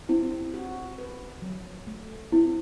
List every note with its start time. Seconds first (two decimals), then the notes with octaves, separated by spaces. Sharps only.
0.09 C4 E4
0.54 F#4
0.98 B4
1.42 F#3
1.87 A3
2.32 C4 E4